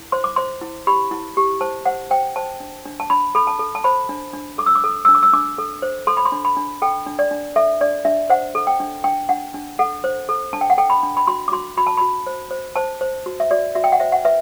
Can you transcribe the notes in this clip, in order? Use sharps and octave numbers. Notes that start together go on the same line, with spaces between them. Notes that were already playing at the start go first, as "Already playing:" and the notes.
Already playing: E4
C5 C6
D6
C5 C6
E4
G4 B5
E4
G4
C5 A5
C5 F#5
C5 G5
C5 A5
D4
D4
A5
D4 B5
A4 B5
A5
A4
A5
C5 B5
D4
D4
A4 D6
E6
D6
A4
D4 E6
D6
E6
D4 D6
A4
C5
A4 C6
B5
C6
D4
B5
D4
A4 G5
D4
D5
D4
A4 E5
D4 D5
D4 E5
C5 F#5
A4
G5
D4
D4 G5
D4 F#5
D4
A4 F#5
C5
A4
D4 A5
G5
F#5
A4 G5
B5
D4
B5
F#4 C6
D6
F#4 C6
F#4 B5
A5
F#4 B5
C5
C5
C5 A5
C5
F#4
E5
F#4 D5
F#4 E5
G5
F#5
C5 E5
F#5
B4 E5